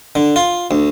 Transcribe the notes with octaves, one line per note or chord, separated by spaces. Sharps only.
D3
F4
D2